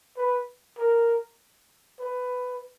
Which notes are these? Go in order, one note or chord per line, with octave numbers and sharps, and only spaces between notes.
B4
A#4
B4